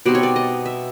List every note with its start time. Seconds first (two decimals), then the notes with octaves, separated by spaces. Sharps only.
0.05 B2 G3 C4 D#4 D5
0.15 C#5
0.23 D5
0.36 D#5
0.66 E5